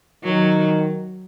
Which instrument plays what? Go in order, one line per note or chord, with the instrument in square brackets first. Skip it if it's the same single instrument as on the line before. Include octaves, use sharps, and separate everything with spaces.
[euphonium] D#3 [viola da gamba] F#3